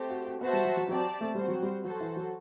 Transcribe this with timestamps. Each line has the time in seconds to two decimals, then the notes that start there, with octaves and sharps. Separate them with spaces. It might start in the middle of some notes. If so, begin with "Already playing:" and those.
Already playing: A3 C4 G4
0.09 F#4
0.25 F#4
0.41 B3 F#4 C5 E5 A5
0.53 G3
0.65 F#3
0.77 F#3
0.89 F#3 C4 G4 D5 A5
1.21 A3
1.35 G3 C4 F#4 C5
1.48 F#3
1.63 G3
1.85 F#3 F#4 A4 C5
2.01 E3
2.16 F#3